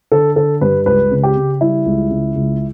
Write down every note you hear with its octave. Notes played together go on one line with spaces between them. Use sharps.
D3 A4
D3 A4
G2 B4
C#2 B4
C#3
G4
C#3
G3 E4
C#2
C#3
C#2